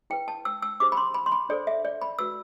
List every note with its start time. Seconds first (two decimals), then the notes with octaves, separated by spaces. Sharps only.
0.10 E4 B4 G5
0.28 A5
0.45 E6
0.62 E6
0.80 D4 G4 C5 D6
0.92 B5
0.97 C6
1.14 B5
1.26 C6
1.32 B5
1.49 D4 A4 C5 D5
1.67 E5
1.85 D5
2.02 B5
2.19 F#4 B4 E6